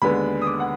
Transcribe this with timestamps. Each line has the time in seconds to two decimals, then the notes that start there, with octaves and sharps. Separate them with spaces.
0.02 D#2 D3 G#3 B3 B5
0.42 D#6
0.47 D6
0.60 F#5